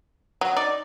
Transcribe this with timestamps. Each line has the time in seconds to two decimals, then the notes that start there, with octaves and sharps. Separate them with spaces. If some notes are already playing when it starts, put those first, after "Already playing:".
0.41 F#3
0.57 D#4 D5